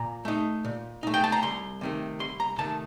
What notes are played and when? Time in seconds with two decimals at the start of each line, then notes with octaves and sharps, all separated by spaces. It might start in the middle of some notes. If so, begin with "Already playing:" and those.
Already playing: A#2 A#5
0.25 A3 D#4
0.65 A#2
1.03 A3 D#4
1.14 G5
1.24 A5
1.32 A#5
1.43 C2 C6
1.81 C3 D#3 A3
2.19 C2 C6
2.40 A#5
2.58 C3 D#3 A3 A5